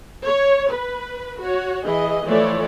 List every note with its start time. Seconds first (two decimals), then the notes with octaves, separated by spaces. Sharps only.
0.25 C#5
0.71 B4
1.40 F#4 C#5
1.85 E3 G#4 D#5
2.26 E3 F3 A3 C#5 D5